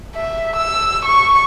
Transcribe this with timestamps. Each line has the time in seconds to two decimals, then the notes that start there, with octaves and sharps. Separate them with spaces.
0.16 E5
0.57 E6
1.05 C#6